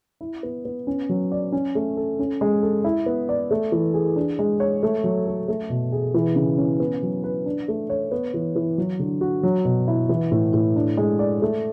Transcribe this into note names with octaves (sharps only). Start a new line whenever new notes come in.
E4
B3
B3
C#4
F#3
D5
C#4
A3
A4
C#4
G#3
A4
E4
B3
D5
A3
E3
G#4
D4
G#3
C#5
A3
F#3
A4
A3
B2
G#4
E3
C#3
C#4
B3
F#3
B4
D4
A3
C#5
B3
E3
E3
F#3
D3
F#4
F#3
B2
E4
E3
A2
A2
D4
G#3
D5
A3